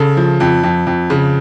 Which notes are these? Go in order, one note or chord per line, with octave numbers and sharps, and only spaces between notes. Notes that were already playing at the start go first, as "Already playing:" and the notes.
Already playing: C#3 A4
F3
F2
F2
F2
C#3